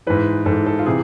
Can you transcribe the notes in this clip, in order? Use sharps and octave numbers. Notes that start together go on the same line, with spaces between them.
G#2 E3 B4
G#2 E3 A4
A4
F4
C3 E3 G#4